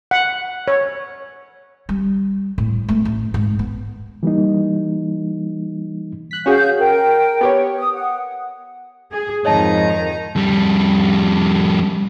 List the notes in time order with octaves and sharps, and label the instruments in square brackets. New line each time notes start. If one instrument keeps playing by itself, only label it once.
[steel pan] F#5
C#5
[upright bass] G3
A2
A3 B3
A1
G#2
B3
[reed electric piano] E3 G3 A#3 D#4
[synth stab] F#6 B6
[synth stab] C#4 F#4 G#4 [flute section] F5 G6
[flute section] A#4 G5
[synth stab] B3 G4 C#5
[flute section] D#6
F#5
[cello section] G#4
[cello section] F2 D#3 [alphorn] G#2 [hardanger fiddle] D#4 A#5 [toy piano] C#5 D#5 A5
[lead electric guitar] F2 G3